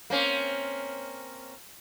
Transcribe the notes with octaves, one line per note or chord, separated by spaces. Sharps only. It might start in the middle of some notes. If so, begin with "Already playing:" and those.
A#3 C4 C#4